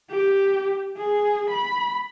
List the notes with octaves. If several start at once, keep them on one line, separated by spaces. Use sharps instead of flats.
G4
G#4
B5